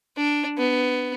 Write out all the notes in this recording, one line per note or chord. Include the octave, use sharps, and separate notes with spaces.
D4
B3